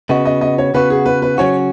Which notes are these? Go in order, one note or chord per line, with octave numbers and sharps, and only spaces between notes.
C#3 B3 F#4 D#5
D#5
D#5
C#5
C#3 B3 F#4 B4
G#4
B4
B4
C#3 F#3 C#4 F#4 C#5